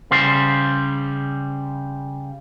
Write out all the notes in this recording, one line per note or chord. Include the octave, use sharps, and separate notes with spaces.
C#3 G3 C5